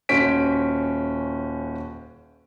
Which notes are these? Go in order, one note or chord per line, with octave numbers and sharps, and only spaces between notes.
D#1 C#4 F#4 C5 B6 D7